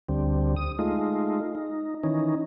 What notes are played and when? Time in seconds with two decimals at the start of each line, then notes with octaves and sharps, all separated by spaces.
0.09 D2 D3 G3 C4
0.56 D#6
0.79 G#3 A3 D#4 F4
1.55 D#4
2.03 D#3 E3 C#4 D#4